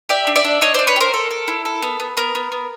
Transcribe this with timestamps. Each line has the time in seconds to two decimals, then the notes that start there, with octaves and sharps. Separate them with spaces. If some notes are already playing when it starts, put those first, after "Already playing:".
0.09 G4 D5 E5
0.27 D4
0.36 D5 E5
0.45 D4
0.61 D4 C#5 D#5
0.74 D4 C5 D5
0.87 B4 C#5
0.96 G4
1.01 A#4 C5
1.14 A4
1.31 A4
1.48 E4
1.65 A4
1.82 B3
2.00 B3
2.17 B3 A#4
2.35 B3
2.52 B3